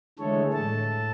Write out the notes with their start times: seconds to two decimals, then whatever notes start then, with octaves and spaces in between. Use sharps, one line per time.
0.19 D3 E3 G#3 A3 A4 C#5
0.54 A2 A4 A5